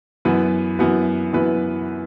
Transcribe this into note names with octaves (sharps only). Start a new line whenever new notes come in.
F#2 E3 B3 F#4 B4
F#2 E3 B3 F#4 B4
F#2 E3 B3 F#4 B4